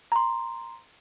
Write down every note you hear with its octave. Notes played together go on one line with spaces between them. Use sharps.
A#5 C6